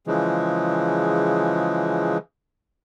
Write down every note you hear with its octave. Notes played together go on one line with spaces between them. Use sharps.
C#3 E3 F3 G#3